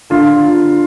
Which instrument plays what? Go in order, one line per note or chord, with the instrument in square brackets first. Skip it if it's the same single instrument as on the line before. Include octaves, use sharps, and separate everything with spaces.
[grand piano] D3 [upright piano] F4